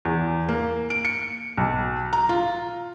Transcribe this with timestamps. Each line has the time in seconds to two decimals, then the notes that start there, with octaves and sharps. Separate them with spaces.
0.05 E2
0.49 A#3
0.90 D7
1.05 C#7
1.58 B1
2.13 A#5
2.29 F4